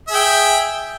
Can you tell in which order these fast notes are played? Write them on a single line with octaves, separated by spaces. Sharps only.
E5 G#4 G5